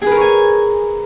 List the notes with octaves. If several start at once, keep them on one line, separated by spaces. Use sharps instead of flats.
G#4 A#4 B4 C#5 G#5